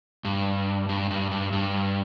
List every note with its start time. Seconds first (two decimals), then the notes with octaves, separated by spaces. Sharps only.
0.25 G2
0.89 G2
1.11 G2
1.31 G2
1.53 G2